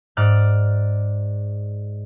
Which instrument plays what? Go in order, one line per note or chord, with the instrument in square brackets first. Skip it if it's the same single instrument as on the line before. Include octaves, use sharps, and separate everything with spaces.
[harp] G#2 D5 F6 F#6